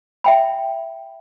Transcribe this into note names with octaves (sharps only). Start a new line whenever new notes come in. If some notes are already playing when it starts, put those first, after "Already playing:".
E5 G5 B5